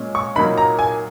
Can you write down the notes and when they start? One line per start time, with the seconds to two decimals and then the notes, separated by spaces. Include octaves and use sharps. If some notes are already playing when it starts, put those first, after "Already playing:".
Already playing: A#2 G#3 C#4
0.15 C#6
0.35 A#2 F#3 A#3 D#4 B5
0.58 A#5
0.79 G#5